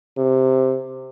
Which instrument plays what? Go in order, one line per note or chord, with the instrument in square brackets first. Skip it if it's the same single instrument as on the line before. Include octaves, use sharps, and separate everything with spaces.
[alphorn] C3